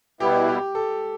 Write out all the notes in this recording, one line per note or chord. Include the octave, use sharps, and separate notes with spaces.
B2 G3 B3 E4 G4
G4
A4